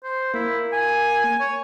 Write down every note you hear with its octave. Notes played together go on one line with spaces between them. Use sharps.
C5
A#3 E4
G#5
C#5